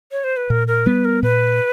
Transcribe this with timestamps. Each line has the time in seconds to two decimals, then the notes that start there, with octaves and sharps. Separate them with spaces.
0.12 C#5
0.24 C5
0.37 B4
0.50 A#2 A#4
0.68 A#4
0.86 G3 B3 B4
1.05 A#4
1.23 A#2 B4